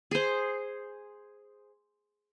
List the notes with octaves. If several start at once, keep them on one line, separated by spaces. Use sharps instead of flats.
G#4 C5